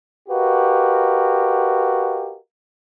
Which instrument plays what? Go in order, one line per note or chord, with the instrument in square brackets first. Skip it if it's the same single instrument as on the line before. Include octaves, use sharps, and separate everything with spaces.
[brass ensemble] F#4 G4 A#4 B4 D#5 F5